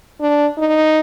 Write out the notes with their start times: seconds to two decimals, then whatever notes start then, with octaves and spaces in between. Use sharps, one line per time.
0.20 D4
0.58 D#4